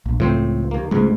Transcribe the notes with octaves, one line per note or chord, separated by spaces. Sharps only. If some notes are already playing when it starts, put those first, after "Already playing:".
A#1
C#2 A2 F3 C4 C5
D#2 A#3
C#2 G#2 G#3 A3